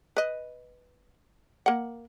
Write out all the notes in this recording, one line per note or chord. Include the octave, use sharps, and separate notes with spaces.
B4 D#5
A#3 F#5